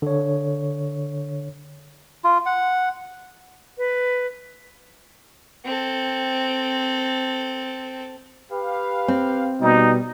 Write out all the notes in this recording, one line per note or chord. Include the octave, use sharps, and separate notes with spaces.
D3 C#5
F4
F#5
B4
C4 A4
G4 B4 F5
C4
B2 G3 D#4